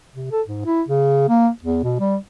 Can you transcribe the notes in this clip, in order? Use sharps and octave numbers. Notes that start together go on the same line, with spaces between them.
C3
A4
G#2
E4
C#3
A#3
E2
B2
G3